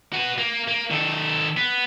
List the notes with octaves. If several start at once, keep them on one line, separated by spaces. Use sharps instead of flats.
F#4 B4
A#3
A#3
D#3 A4
B3